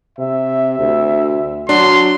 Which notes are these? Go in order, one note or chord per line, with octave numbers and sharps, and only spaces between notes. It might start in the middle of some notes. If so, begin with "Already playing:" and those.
C3 E5
D2
F#3 D4 C6